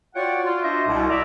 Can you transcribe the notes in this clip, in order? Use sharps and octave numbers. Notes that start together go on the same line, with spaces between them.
F4 F#4 C#5 D5 F#5 G5
F4
D4 F#4 C5 D#5 E5
C2 B2
D5 E5 A#5